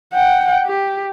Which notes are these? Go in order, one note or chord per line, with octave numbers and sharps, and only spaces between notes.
F#5 G5
G4